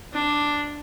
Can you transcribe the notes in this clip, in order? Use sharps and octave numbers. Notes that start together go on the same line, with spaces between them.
D4